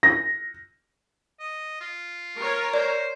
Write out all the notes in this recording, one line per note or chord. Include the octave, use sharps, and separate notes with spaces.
A#6
D#5
F4
A#4 C#5
C5 D5